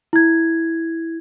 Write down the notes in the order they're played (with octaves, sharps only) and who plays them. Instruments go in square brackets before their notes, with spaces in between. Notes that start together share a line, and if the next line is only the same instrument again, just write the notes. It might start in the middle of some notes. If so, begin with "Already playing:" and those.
[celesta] E4 G#6